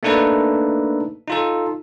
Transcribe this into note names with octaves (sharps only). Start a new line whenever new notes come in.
A3 A#3 D4 D#4 A4 B4
D#4 F4 A4